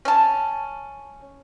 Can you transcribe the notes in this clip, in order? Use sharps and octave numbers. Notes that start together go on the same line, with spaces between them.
C#4 A5